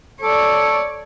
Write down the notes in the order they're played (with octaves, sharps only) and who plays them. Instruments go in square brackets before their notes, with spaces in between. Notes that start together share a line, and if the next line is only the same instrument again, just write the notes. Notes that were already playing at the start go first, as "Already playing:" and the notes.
[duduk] A4 [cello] C#5 D5